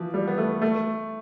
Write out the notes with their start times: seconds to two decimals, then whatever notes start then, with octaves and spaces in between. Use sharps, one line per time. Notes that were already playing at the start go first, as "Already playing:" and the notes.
Already playing: E3 F3
0.14 G3
0.28 B3
0.38 A3
0.62 A3